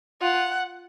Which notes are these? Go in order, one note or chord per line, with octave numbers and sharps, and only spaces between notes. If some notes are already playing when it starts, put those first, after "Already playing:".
F4 F#5